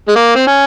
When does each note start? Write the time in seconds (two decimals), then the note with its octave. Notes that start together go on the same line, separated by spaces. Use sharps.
0.08 G#3
0.15 A#3
0.35 C4
0.47 C#4